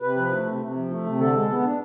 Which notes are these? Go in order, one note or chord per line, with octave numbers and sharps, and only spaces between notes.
C3 B4
F3
A3
C3
C3
F3
A3
C3
D3 A4
G#3
B3
D4